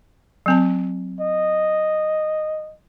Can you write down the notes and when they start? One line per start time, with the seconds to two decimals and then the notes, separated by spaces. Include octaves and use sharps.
0.46 F#3 C4 A5
1.21 D#5